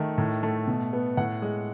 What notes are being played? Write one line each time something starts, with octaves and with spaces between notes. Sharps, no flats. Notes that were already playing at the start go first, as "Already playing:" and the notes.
Already playing: D#3 A3
A2
A3
B2
B3
A2 F#5
G#3